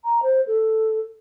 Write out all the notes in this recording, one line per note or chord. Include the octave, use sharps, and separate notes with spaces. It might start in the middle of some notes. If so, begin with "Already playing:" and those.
A#5
C5
A4